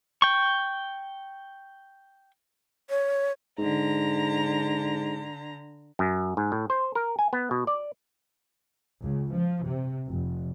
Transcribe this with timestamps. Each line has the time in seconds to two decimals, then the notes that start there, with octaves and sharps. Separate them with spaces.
0.22 G5 C#6
2.90 C#5
3.58 G#2 D3 A#5
5.99 F#2
6.37 G#2
6.52 A2
6.70 C5
6.95 A#4
7.19 G#5
7.33 B3
7.51 B2
7.67 D5
9.03 C#2
9.34 F3
9.64 C3
10.09 F1